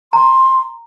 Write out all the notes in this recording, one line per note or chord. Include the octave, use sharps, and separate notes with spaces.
A#5 C6